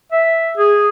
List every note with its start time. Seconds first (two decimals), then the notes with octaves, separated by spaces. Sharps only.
0.12 E5
0.57 G#4